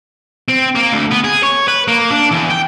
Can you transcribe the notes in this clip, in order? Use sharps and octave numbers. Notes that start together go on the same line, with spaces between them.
C4
A#3
D2
B3
G#4
C#5
B4
A#3
D4
E2
G5